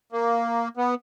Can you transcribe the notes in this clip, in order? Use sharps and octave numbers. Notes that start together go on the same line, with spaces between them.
A#3
B3